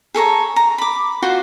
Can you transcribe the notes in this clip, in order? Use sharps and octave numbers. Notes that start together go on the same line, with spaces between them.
G#4 A4 C#5 A#5
A#5
B5 D6
F4 F#4 C5 F#5